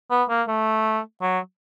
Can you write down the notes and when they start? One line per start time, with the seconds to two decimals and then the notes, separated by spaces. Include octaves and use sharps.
0.10 B3
0.29 A#3
0.48 A3
1.22 F#3